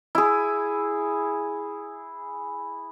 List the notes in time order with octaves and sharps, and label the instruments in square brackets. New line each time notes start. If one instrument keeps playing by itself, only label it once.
[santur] E4 G#4